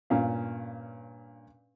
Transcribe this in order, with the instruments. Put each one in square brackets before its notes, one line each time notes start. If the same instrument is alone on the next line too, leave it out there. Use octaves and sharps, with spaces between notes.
[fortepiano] G2 A#2 C#4 F5